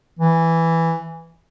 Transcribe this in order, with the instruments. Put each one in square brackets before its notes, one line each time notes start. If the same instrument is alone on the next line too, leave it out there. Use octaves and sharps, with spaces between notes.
[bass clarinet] E3